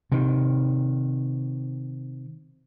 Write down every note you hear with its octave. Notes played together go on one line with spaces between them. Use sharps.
C3 D#3